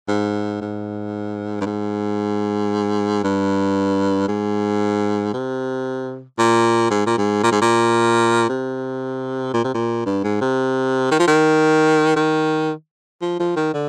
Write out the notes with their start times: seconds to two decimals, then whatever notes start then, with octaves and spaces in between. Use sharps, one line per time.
0.08 G#2
0.61 G#2
1.61 G2
1.66 G#2
3.24 G2
4.28 G#2
5.34 C3
6.38 A#2
6.90 G#2
7.06 A#2
7.18 G#2
7.43 A#2
7.52 G#2
7.61 A#2
8.49 C3
9.54 A#2
9.64 C3
9.74 A#2
10.06 G2
10.24 G#2
10.41 C3
11.11 D#3
11.19 F3
11.28 D#3
12.16 D#3
13.22 F3
13.39 F3
13.56 D#3
13.74 D3